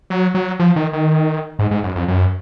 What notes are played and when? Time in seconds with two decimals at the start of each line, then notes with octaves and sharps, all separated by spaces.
0.10 F#3
0.35 F#3
0.60 F3
0.76 D#3
0.93 D#3
1.59 G#2
1.71 G#2
1.83 F#2
1.96 F2
2.08 F#2